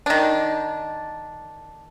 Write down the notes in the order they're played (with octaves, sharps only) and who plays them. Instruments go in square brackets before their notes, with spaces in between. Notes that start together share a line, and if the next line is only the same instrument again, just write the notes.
[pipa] D#3 D4